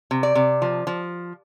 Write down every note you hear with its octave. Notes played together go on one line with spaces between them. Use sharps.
C3
D5
C3
F3
F3